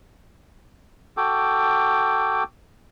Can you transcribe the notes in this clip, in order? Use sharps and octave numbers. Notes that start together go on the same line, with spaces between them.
F#4 A4 G5 D6